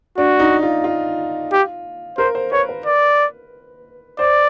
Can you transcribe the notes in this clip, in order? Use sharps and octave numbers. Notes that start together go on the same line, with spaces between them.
D4 F#4
D#4
F4
F4
G4
A#4 C5
C5
B4 C#5
B4
D5
C5 D5